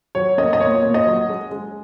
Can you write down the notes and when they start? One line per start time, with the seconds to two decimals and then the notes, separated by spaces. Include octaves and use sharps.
0.15 F#3 C#5
0.38 A#3 D#5
0.53 D#5
0.60 A#2 C#5
0.83 A#2
0.94 D#5
1.07 F#3
1.29 G#3
1.51 G#3